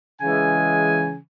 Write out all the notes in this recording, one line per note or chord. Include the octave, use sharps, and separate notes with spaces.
C#3 E3 G#3 G#5